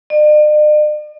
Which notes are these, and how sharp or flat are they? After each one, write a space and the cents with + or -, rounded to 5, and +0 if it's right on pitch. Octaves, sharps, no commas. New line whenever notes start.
D5 +45